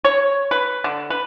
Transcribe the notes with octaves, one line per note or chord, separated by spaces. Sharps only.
C#5
B4
D3
B4